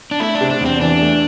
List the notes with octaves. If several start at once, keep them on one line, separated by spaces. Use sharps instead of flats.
D4
A3 E4
D4
C3
D4
E2 C4
E3 D4
A3